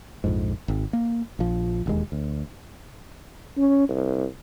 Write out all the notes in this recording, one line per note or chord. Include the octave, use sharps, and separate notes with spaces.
A#1 F2 G#2
G#1
A#3
A#1 F3
E1 D#2 G#3
D2
C#4
C2